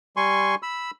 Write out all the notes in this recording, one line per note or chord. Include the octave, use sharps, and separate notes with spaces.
G3 G#5 C6 C#6
B5 E6